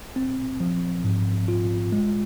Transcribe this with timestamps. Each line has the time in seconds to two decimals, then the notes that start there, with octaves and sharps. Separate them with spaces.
0.16 C4
0.60 F3
1.04 G#2
1.48 F4
1.92 G#3